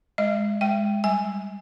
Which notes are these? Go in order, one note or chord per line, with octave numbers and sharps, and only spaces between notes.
G#3 D#5
G#3 G5
G3 G#5